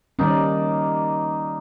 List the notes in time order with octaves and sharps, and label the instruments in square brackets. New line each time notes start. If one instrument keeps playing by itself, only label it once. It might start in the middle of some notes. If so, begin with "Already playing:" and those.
[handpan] D#3 G3 C#4 [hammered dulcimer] A#3 D#4 D5